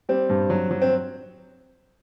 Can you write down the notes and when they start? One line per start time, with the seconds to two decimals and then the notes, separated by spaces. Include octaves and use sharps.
0.09 G3 C4
0.30 G2
0.50 F#3
0.71 F#3
0.81 C4